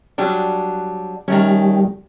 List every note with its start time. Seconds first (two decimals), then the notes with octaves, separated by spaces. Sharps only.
0.18 F#3 G3 D4
1.28 D#3 G3 A3 C#4